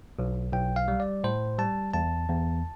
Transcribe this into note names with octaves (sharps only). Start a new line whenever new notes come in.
B1
B1 G5
F5
G3
D5
A2 C5
G3 A5
E2 A5
E2